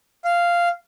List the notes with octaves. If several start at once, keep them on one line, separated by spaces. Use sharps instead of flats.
F5